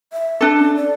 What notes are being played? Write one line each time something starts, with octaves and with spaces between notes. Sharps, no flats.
E5
D4 A4
C#4
D5